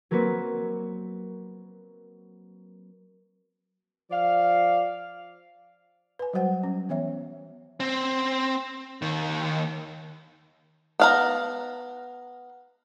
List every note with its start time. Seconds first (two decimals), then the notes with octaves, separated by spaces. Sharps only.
0.11 F#3 A#3 C4 F#4 B4
4.11 F3 D5 F5
6.19 B4 G#5
6.33 F#3 G3 F#4 C5 F#5
6.63 C#4
6.89 E3 B3 C#5 E5
7.80 C4
9.02 D#2 D#3
11.00 B3 F5 A#5